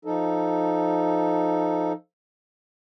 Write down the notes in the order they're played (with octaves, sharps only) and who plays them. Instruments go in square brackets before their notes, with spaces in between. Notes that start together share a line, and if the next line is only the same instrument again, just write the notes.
[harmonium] F3 D#4 A4